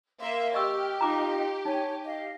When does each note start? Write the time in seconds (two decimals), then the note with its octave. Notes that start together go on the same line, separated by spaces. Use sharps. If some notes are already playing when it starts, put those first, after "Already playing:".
0.20 A#3 E5 F5 C6
0.54 G4 D#5 C#6 E6 F6
1.01 D#4 F4 D#5 A#5 D6
1.65 D#4 C#5 G#5
2.06 D#5 F5